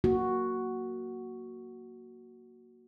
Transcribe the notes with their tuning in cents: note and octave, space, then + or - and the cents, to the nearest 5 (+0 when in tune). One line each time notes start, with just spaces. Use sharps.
A#3 +0 F#4 +0